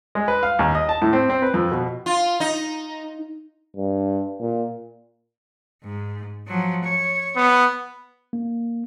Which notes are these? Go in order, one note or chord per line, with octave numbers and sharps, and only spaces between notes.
G#3
B4
F5
D#2
D#5
A5
A2
C4
C4
B4
F2
B2
F4
D#4
G2
A#2
G#2
F3 F#3
C#5
B3
A#3